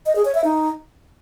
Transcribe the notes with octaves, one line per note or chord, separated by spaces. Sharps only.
D#5
G#4
C#5
E5
D#4